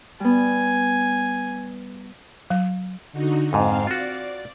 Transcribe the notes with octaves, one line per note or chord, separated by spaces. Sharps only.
G3 B3 G#5
F#3
D3 D#4 F#4
F2 G#2 C4 F5
F4 F#4 D5